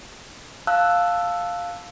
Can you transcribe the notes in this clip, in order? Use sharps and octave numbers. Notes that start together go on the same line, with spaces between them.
F5 A5 E6 F#6